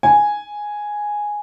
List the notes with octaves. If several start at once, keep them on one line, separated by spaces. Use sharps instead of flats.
G#5